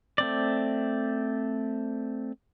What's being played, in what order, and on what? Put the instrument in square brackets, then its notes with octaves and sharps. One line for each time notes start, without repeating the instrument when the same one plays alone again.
[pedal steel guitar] A3 C4 D5